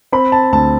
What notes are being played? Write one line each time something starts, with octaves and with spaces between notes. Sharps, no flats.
C4 B5
A5
D2 A5